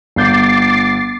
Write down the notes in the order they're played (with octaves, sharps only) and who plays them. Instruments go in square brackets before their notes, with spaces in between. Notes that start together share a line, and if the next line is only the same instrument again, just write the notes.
[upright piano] G1 G6 [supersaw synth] D6 A6 C7